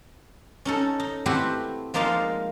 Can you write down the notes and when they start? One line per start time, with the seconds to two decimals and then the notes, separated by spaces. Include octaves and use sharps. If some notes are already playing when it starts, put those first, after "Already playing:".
0.65 C#4 D#4 A4
1.00 D#4
1.26 A3 C4 E4 F#4 G4 B4
1.94 F3 G#3 A#3 D#4 D5 F5